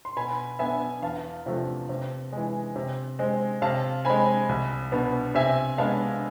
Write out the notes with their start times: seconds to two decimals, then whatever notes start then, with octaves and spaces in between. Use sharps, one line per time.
0.05 C6
0.17 B2 G#5 B5
0.59 B3 D4 E5 G#5
1.02 E2 F5 A5
1.46 C3 F3 A3 D4
1.89 C3
2.32 E3 G#3
2.76 C3
3.19 G#3 C4
3.62 C3 F5 A5
4.05 G#3 C4 G#5 B5
4.49 C2
4.92 B2 B3 D4
5.35 C3 E5 G#5
5.78 G#3 B3 D4 F5 A5